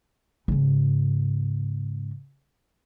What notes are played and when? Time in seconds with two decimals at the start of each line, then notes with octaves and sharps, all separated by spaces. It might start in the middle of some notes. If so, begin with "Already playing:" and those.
0.48 G#2 C#3